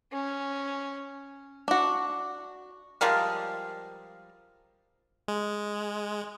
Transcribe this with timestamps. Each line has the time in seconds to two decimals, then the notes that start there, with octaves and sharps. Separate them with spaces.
0.12 C#4
1.68 D4 F#4
3.01 F3 G3 G#3 A#4
5.28 G#3